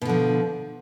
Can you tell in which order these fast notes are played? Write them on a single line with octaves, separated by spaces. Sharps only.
B2 D3 F3